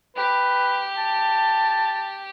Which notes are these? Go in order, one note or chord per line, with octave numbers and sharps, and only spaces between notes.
G4 B4
A5